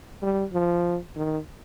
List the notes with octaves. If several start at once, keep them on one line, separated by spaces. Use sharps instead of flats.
G3
F3
D#3